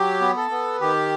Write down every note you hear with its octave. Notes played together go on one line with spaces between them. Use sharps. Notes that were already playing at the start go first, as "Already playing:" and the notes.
Already playing: F#3 G4
B3
A4
B3
D#3 G4